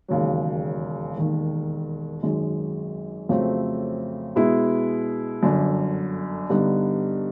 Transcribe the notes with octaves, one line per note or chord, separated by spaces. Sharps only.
E1 D#2 C#3 F#3
E1 D#2 D#3
G#1 F#2 D#3 G#3
F2 C#3 F#3 A3 C4
B2 G#3 B3 E4
G1 F#2 D3
G2 D3 G3 B3 D#4